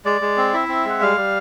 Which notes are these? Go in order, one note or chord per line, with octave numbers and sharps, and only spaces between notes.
G#3 D5
G#3
C4
E4 E5
C4
G#3 F#5
G3 F5
G3